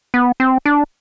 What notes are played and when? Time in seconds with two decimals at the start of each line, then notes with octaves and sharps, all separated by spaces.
0.14 B3
0.40 C4
0.66 D4